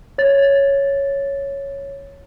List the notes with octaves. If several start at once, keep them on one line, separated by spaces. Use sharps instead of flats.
C#5 A6